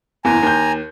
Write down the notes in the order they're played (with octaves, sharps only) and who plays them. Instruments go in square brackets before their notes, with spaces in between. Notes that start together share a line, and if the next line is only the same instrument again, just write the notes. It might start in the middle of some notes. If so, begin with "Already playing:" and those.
[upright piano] F#1 E2 [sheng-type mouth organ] G#5 A#5
[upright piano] D#2 G6